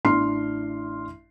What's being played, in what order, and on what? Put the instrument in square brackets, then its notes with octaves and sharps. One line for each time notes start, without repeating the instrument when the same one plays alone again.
[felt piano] A1 D4 E4 C6 F6 C7